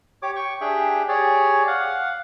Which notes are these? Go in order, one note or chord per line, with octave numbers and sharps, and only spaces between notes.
G4 C#5 D6
G5 C#6
D4 G4 G#4 E5 G5
G4 G#4 C#5 D5
F5 F#5